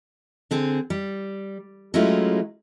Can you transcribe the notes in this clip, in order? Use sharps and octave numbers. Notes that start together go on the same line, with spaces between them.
D3 C4 G#4
G3
F#3 G#3 A3 C#4 E4 F4